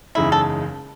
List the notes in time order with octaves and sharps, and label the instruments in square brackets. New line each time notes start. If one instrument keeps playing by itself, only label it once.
[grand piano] F#1 E2 C#3 G#3 D#4 [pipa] E4
[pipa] A4